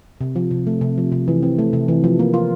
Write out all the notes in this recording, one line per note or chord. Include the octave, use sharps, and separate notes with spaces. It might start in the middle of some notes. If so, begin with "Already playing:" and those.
C3
F3
C3
A3
C3
F3
C3
E3
C4
A3
C3
E3
F3
A#3
F4